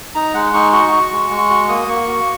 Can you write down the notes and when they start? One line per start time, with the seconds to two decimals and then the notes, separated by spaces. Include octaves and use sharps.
0.15 D#4 A#5
0.34 G#3 F#5
0.53 D#4 C#6
0.73 F#4 C#6
0.92 F#4
1.11 G#3
1.30 G#3
1.50 F#4
1.68 A#3 D#6
1.88 A#3 C#6
2.07 F#4